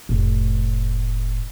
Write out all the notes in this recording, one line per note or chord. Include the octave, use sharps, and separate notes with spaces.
F1 A2